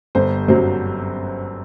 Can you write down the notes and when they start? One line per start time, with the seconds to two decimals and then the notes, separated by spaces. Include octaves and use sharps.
0.15 G1 C5
0.48 F#2 F#3 C5